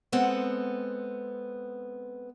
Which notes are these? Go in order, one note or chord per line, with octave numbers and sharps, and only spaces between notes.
G#3 B3 C4 A4 F#5